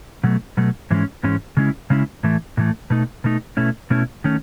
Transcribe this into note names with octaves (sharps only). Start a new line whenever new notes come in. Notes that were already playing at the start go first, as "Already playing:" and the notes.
B2 F#3 A3
B2 F#3 A3
G#2 E3 G#3 C#4
G#2 E3 G#3 C#4
C#3 G#3 C#4 E4
C#3 G#3 C#4 E4
A2 E3 A3
A2 E3 A3
B2 A3 D#4
B2 A3 D#4
B2 A3 C#4 E4
B2 A3 C#4 E4
D#3 A3 C#4